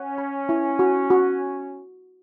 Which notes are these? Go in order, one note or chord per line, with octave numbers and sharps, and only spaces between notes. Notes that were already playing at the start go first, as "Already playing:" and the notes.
Already playing: C#4 F#5
B5
E4
F#4
F#4